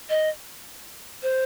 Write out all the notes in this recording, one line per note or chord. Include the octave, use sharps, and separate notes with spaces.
D#5
C5